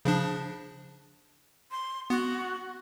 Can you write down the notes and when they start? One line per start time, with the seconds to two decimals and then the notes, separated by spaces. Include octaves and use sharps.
0.05 C#3 F3 D4
1.71 C6
2.10 B3 F#4